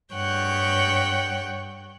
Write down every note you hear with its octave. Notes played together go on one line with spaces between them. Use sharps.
G2 C#5 F#5 G5 G6